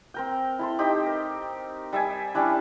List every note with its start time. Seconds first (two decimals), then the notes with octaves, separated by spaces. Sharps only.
0.14 C4 A#4 G5
0.59 E4 A4 C6
0.79 C4 D#4 G4
1.06 A#4
1.93 G3 E5 G#5
2.35 G3 C#4 D4 E4